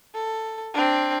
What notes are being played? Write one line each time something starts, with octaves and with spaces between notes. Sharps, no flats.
A4
C4 D4